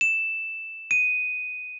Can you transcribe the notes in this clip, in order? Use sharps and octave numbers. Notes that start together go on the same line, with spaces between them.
E7
D#7